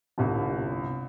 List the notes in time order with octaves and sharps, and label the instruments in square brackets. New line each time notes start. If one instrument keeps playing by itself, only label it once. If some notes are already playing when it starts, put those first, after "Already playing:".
[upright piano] G1 C2